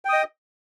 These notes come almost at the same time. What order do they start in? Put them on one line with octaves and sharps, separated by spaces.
G5 D#6 D#5